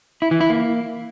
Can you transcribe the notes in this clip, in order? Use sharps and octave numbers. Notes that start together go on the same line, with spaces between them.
E4
E3
E4
A#3